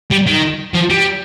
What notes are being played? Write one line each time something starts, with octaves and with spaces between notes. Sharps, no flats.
G3
D#3
F3
G3